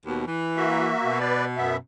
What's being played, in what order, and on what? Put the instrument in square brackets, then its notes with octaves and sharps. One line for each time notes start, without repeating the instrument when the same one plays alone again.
[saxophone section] D#2 B2
E3
[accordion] A#3 F#4 E5
[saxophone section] B2
[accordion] B4 D5
F#2 B3 E5